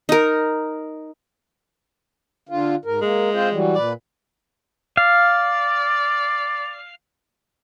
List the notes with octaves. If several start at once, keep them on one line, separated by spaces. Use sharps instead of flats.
D#4 A#4
D3 F4
G#2 A#4
G#3 A#3
C4 F4 C5
E3 F#3 G3
A#2 B4 D5
D5 F5